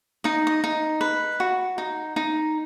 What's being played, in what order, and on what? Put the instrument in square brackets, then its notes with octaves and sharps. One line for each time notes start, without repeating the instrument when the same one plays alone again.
[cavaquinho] D#4 D#5
D#5
D#4
B4
F#4
D#4
D#4